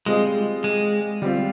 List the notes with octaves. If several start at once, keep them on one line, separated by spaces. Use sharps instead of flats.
G3 G#3 C4 F4 G#4 D#5
G#3
G3 C4 F4